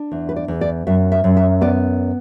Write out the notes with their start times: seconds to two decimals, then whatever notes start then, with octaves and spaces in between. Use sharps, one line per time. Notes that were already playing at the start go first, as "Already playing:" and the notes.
Already playing: D4
0.12 E2
0.29 B4
0.36 D5
0.48 E2
0.61 D5
0.87 F#2 E5
1.12 E5
1.24 F#2
1.37 E5
1.61 B3 D5